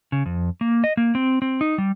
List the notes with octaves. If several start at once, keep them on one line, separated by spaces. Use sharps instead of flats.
C#3
F2
A#3
D#5
A#3
C4
C4
D#4
G3